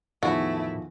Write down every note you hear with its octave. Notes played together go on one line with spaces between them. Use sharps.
E2 A2 D#3 F3 A3 E4 F#4